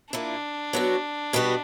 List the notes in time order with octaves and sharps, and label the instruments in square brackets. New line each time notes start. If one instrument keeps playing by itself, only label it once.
[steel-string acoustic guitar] A#2 A#3 E4 [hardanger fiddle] D4
[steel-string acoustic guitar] F#3 B3 F#4
B2 G3 B3 F#4